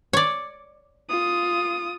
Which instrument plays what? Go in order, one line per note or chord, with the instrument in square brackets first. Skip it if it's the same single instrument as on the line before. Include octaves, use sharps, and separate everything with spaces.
[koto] C#5 D5
[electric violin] F4 D#6